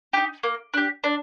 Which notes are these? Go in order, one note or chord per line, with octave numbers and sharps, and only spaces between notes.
D#4 G4
A#3
D4 G4
D4